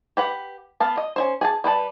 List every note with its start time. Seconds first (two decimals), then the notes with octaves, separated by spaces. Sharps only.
0.17 G4 B4 F#5
0.80 B3 F5 A5
0.97 D#5
1.16 C#4 E4 C5
1.41 G#4 G#5 A5
1.64 G3 B4 C5 A5